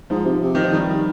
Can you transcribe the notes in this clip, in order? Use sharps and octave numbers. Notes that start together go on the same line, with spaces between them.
G#2 F3
C3
C3
D#3
F3
D#3 G3
D#3